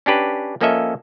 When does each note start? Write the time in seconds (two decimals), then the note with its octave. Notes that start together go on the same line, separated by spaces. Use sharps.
0.06 C#4 D4 G4 B4
0.61 F3 A#3 C#4 A4 D#5 E5